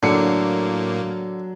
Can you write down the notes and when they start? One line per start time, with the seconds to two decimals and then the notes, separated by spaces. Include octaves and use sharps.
0.03 A2 D3 F#3 A#3 C#7